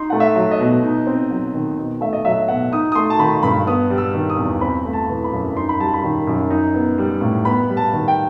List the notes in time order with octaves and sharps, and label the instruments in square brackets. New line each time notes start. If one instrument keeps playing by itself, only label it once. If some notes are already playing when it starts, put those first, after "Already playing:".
Already playing: [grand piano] D#4 C6
A3 F#5
E5
F#3
D#5
B2
D#4
C4
F#3
D#3
B2
A3 E5
D#5
F#3 E5
B2 F#5
D#4 D#6
D#6
A3 C6
A5
D#3 B5
G2 B5
B3 D#6
G3
E6
D#3
D#6
E2
C4 B5
A3
A5
E3
B5
F#2
D#4 C6
B5
G3 A5
B5
D#3
F#2
D#4
B3
G3
A2
B3 B5
G3
A5
D#3
G5